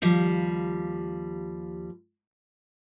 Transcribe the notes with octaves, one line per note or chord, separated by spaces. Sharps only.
D#2 F3 G3